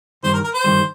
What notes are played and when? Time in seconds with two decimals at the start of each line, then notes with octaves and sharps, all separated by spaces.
0.23 G2 D#3 G3 C5
0.33 A#4
0.44 A#4
0.54 C5
0.64 G2 D#3 G3